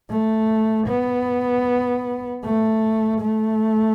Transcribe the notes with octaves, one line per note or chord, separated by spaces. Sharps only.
A3
B3
A3
A3